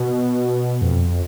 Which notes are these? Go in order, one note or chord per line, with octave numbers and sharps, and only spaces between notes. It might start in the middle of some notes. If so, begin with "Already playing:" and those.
Already playing: B2
F2